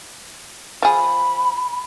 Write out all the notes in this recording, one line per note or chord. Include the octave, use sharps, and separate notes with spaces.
F3 G#4 B5